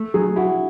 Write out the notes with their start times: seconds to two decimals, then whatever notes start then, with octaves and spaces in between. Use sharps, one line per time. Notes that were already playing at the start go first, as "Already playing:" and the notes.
Already playing: A3
0.14 F#3 G#4
0.36 E4 F#4